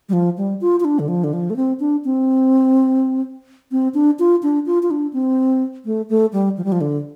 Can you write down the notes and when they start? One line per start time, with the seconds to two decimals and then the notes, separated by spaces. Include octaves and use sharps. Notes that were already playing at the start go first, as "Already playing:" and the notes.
0.09 G3
0.13 F3
0.37 G3
0.61 F4
0.80 F4
0.85 D4
0.99 D3
1.08 F3
1.24 D3
1.33 F3
1.50 A3
1.56 C4
1.80 D4
2.05 C4
3.72 C4
3.94 D4
4.19 F4
4.43 D4
4.66 F4
4.83 F4
4.91 D4
5.13 C4
5.85 A3
6.09 A3
6.33 G3
6.57 F3
6.64 G3
6.72 F3
6.81 D3